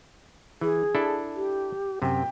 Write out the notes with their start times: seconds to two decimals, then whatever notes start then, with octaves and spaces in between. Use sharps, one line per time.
0.61 E3 G#4
0.95 D4 E4 A4
1.36 G4
2.02 F#2 C3 G5